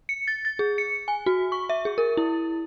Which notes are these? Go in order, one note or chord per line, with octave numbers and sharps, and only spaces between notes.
C#7
A6
A6
G#4
C#7
G#5
F#4
C#6
E5
G#4
A#4
E4